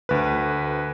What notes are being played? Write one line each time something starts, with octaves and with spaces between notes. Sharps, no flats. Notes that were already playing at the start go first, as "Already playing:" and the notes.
D2 B4